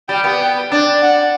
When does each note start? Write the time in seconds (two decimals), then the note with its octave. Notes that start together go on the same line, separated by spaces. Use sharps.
0.09 G3 G5
0.24 B3
0.40 G5
0.72 D4
1.02 F#5